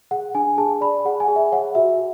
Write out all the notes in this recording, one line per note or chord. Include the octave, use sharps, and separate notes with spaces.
G#4 F#5
D4 G#5
G#4 A5
D5 B5
G#4 F#5
G#5
G#4
E5
C#5 F#5
F#4 E5